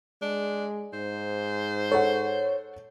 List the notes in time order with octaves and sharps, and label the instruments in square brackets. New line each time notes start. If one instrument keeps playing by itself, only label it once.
[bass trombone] G#3 [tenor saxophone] D4
[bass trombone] G#2 [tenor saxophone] C5
[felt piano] A4 F#5 [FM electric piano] C#5